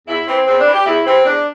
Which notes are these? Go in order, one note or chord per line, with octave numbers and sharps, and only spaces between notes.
E2 E4
E3 C4
E2 C4
D4
E3
G4
E2 E4
C3 E3 C4
E2 D4